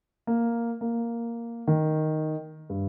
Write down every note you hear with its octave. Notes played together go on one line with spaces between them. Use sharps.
A#3
A#3
D#3
G2